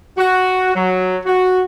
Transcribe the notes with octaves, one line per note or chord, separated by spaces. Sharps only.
F#4
F#3
F#4